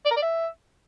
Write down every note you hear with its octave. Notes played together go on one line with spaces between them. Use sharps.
D5
A#4
D5
E5